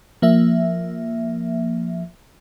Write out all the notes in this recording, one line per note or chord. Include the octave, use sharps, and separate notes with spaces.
F3 A#3 E5